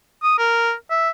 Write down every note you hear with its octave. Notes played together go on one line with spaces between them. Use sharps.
D#6
A#4
E5